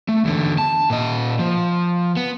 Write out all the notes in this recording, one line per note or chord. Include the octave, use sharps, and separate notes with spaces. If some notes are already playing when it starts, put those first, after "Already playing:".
A3
E2 D3
A5
A#2 D#5
F3
B3